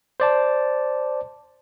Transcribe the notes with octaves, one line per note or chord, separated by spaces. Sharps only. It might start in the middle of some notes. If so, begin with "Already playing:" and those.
C5 D5 A5